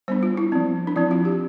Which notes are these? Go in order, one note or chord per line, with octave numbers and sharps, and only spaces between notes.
G3 B3 D4 C5
F4
E4
F3 C4
D4
F3 C4 E4
F4
G4